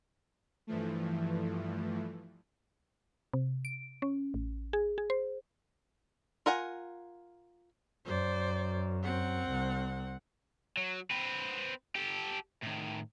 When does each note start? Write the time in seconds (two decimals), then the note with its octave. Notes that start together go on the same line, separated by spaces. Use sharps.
0.67 G2 E3 F3 A3
3.33 C3
3.65 D7
4.02 C#4
4.34 A1
4.73 G#4
4.98 G#4
5.10 C5
6.46 F4 A#4 F#5 G#5
8.06 F#2 C5 D5
9.03 C4 F#5
9.47 C2
10.77 F#3
11.11 C4 B4
11.95 G4 A4
12.62 A2 D#3